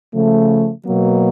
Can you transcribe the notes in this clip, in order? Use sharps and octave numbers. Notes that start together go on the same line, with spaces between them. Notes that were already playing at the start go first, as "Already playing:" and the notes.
C#3 F3 A3
B2 F#3 A#3